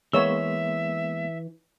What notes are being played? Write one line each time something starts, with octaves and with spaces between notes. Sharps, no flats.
E3 G#3 A#3 B3 C#5 E5 E6